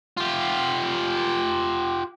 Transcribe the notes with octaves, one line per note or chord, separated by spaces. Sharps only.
F4 G4